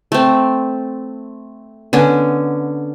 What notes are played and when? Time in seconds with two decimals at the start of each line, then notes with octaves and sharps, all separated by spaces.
0.12 A3 C4
1.93 D3 B3 C#4